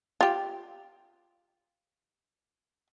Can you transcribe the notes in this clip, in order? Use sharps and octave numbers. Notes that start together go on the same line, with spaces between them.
F4 G4